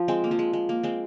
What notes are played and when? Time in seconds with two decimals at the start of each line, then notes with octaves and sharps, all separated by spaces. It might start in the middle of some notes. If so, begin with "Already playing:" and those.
Already playing: F3
0.08 G#3 C4
0.24 A#3
0.31 F3
0.39 G#3
0.53 G#3
0.69 A#3
0.83 G#3 C4